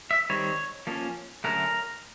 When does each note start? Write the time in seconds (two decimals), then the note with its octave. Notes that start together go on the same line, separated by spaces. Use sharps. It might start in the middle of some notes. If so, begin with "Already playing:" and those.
0.11 E5
0.30 D#3 G3 C4 C#5
0.87 F3 A#3 C#4
1.44 D3 F#3 A3 C#4 A#4